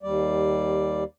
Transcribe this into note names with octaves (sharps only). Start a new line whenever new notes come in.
D#2 G3 D5